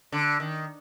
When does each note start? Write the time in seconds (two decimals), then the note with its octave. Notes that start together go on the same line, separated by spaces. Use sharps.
0.12 D3
0.40 D#3